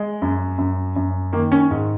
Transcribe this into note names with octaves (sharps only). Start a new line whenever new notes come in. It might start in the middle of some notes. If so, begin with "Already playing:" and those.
Already playing: G#3
F#2
F#2
F#2
D#3 A#3
C#4
G#2